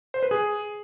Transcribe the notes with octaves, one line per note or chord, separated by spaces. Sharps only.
C5
B4
G#4